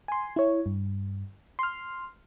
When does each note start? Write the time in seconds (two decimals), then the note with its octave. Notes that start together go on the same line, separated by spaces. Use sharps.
0.08 G#5 C6
0.36 E4 C#5
0.66 G2
1.59 C6 F6